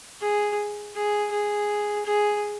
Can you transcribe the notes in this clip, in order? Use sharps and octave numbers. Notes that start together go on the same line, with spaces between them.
G#4
G#4
G#4
G#4